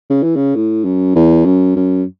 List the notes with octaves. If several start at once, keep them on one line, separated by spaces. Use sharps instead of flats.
C#3
E3
C#3
A2
F#2
E2
F#2
F#2